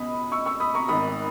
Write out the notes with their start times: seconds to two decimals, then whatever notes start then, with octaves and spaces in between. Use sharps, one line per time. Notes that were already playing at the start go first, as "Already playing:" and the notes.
Already playing: C#2 B2 B5 D#6
0.32 C#6 E6
0.46 C#6 E6
0.60 B5 D#6
0.74 A#5 C#6
0.88 G#1 G#2 D#3 B5 D#6